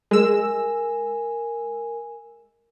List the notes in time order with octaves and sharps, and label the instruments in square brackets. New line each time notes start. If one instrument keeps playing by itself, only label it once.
[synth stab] G#3 E6 [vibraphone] A#4 G#5